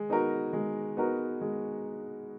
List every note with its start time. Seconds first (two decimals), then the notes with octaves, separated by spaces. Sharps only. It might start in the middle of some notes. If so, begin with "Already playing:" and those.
Already playing: G#3
0.09 B3 D#4 F#4 A#4
0.53 G#3
0.97 B3 D#4 F#4 A#4
1.41 G#3